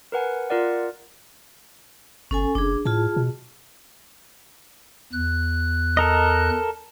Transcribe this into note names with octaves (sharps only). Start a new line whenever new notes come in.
A#4 B4 F#5 G#5
F4 A#4 D5 F#5
G1 C#4 A4 G#5
F#1 D4 G#4
A2 F4 G#4 A5
B2
E2 F#6
A4 A#4 D#5